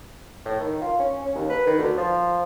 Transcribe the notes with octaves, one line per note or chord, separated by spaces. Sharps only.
A2
D#3
F4
C#4
C#4
D#2
B4
D#3
D2
F3